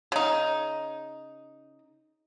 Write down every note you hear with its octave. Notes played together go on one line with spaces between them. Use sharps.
C#3 D#4